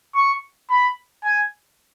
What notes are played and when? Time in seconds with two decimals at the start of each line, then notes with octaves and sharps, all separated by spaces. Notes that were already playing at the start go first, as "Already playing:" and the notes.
0.15 C#6
0.70 B5
1.24 G#5